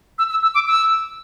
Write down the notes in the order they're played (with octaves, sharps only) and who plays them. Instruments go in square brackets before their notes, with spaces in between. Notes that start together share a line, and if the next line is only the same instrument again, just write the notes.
[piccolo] E6
E6
E6
D6
E6